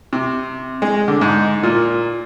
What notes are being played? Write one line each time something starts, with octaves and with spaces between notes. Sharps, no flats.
C3
G#3
D3
G#2
A#2